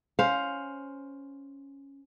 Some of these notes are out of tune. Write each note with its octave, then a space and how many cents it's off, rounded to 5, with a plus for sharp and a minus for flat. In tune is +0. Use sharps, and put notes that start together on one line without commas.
C#4 +0 C5 +0 F5 +10